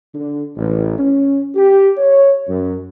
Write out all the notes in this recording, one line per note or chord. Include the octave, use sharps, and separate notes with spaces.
D3
A1
C#4
G4
C#5
F#2